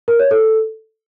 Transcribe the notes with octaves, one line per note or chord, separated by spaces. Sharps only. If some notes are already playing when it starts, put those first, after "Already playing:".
A#4
C#5
A4